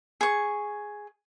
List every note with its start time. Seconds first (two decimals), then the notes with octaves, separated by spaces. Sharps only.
0.21 G#4 C#6